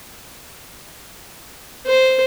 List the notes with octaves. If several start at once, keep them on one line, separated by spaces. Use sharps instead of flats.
C5